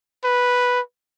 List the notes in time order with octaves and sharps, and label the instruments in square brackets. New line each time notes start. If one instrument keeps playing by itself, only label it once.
[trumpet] B4